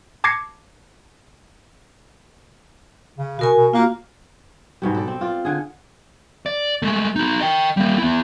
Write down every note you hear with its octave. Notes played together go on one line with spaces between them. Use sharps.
A5 D6 G#6 A#6 C7 C#7
C#3
B2 F#4 A#4 G#5
B2
A#3 F4 F#4
G#2 B2 G3
A4 D5
C4
F4 D5
D3 G#4
D5
G#3 A3
D#4 F#4
D#5 G5
G3 A#3
B3 E4